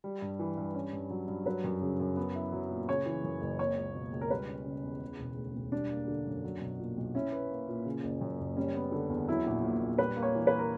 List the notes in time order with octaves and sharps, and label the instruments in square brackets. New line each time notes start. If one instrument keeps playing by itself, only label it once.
[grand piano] G3
G2
E3
G2
C#4
G2
F#3
G2
[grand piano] F#3 [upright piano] B4
[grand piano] F#2
C#3
F#2
B3
E4
F#3
A#2
[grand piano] C#3 [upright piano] C#5
[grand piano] E3
F#2
F#1
[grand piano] A#3 [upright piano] C#5
[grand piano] C#2
B2
C#2
[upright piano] A#4
[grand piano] G3 [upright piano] B4
[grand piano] C#4
C#3
E2
C#3
E1
D2
E1
[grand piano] G3 [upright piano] D4
[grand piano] A#3
D3
F#2
F#3
B1
A#2
B1
[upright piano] C#4 [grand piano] E4
[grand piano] B4
A#3
A#2
C#3
F#1
F#2
F#1
[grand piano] G3 [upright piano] C#4
[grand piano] B3
D3
E2
[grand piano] F#3 [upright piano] E4
[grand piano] A#1
A#2
A#1
[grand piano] G3 [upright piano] B4
[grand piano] A#3
[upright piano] C#5
[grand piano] E3
[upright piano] B4
A#4